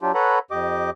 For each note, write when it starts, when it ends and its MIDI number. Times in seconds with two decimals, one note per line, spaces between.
0.01 0.12 54
0.01 0.12 62
0.01 0.12 65
0.01 0.12 67
0.14 0.39 69
0.14 0.39 71
0.14 0.39 73
0.14 0.39 78
0.14 0.39 82
0.14 0.39 83
0.51 0.90 41
0.51 0.90 67
0.51 0.90 75
0.51 0.90 86